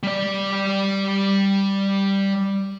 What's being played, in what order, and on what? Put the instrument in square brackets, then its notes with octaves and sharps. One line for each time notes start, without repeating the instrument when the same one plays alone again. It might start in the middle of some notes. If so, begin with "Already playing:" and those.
[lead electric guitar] G3 D5